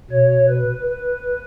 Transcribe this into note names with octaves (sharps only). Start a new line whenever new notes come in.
B2 C#5
B4
B4